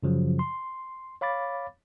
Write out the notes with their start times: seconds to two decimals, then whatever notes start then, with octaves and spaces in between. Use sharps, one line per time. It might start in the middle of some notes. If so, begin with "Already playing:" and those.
0.03 F#2 C#3 F3 F#3
0.39 C6
1.21 C#5 F5 B5 D6 A6